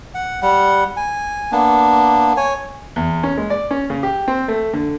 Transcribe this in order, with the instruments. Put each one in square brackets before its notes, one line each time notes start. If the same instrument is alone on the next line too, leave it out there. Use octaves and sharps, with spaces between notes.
[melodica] F#5
G3 F#5
G#5
A#3 B3 D4
C#5 G#5
[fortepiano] E2
C#4
G#3
D5
C#4
C#3
G4
C4
A3
D3